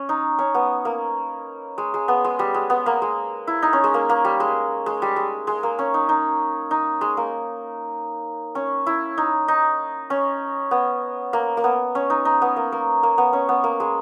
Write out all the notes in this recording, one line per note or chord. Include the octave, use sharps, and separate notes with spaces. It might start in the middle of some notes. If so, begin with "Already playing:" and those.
Already playing: C#4
D#4
C#4
B3
A#3
G#3
G#3
B3
G#3
G3
G#3
B3
A#3
G#3
E4
D#4
C#4
G#3
A#3
A#3
G3
G#3
G#3
G3
G#3
G#3
A#3
C#4
D#4
D#4
D#4
G#3
A#3
C#4
E4
D#4
D#4
C#4
B3
A#3
A#3
B3
C#4
D#4
D#4
B3
A#3
A#3
A#3
B3
C#4
B3
A#3
G#3